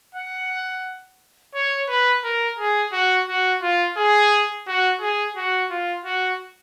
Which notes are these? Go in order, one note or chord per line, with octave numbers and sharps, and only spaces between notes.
F#5
C#5
B4
A#4
G#4
F#4
F#4
F4
G#4
F#4
G#4
F#4
F4
F#4